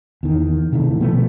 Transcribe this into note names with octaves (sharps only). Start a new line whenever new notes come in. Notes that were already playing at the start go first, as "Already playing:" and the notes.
E2 D#3
C3 D#3 E3 A3
B2 F3 A3 B3